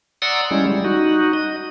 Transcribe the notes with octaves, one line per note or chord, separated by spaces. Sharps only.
D5 F#5 A#5 C6 D#6 E6
G3 G#3 C#4 E4
G3
D#4 F#4
D#5